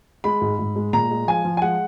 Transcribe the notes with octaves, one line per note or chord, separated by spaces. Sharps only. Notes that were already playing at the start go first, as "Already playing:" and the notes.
G#3 B5
G#2
G#2
G#3
A#2 A#5
G#3
F3 G#5
F3
G#5
G#3 F#5